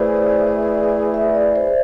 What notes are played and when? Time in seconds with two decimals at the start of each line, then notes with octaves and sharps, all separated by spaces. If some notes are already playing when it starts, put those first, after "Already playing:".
Already playing: E3 A3 E4 G#4 B4 C5 D5
1.14 E5
1.35 D5
1.56 C5